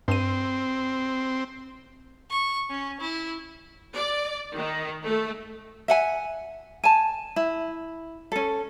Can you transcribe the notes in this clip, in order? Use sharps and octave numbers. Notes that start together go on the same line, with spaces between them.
G2 C4 D#7
C#6
C#4
E4
D5
D#3
A3
E5 F#5 G#5
G#5 A5
E4
C#4 A4